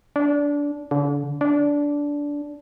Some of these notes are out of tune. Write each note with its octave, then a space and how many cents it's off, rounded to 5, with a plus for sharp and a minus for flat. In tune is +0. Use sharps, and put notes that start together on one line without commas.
D4 -20
D3 -35
D4 -15